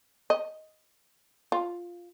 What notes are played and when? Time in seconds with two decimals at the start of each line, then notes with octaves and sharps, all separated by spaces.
0.30 D#5
1.52 F4